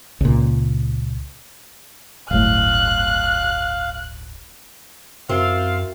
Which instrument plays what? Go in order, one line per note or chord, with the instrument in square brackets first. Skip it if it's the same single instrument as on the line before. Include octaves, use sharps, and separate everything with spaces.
[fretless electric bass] C#2 A#2
[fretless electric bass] D1 G1 A2 [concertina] F5 [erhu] F#6
[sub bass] F#2 [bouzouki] C4 [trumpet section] F4 F5 [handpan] F#4 A#4 E5